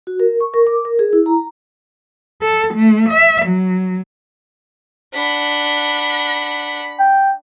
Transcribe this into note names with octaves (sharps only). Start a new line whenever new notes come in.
F#4
A#4
C#6
A#4
D6
A#4
G#4
E4
A#5
A4
A3
E5
F#3
D4 F#5 B5 B6
G5